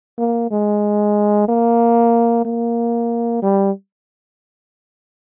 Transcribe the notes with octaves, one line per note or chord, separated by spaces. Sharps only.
A#3
G#3
A#3
A#3
G3